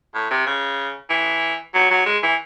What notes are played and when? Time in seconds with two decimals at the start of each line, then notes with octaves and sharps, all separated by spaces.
0.15 A2
0.31 C3
0.46 C#3
1.10 E3
1.75 F#3
1.91 F#3
2.06 G#3
2.23 E3